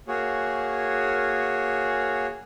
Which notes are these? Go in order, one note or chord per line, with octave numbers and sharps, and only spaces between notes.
A#3 F#4 G#4 C#5